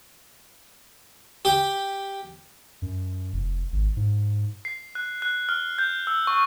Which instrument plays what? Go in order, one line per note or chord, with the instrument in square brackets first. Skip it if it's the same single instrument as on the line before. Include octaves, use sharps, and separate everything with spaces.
[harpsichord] G4 G5
[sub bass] F#2
F1
G#1
G#2
[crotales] C7
F#6
F#6
F6
G6
E6
C#6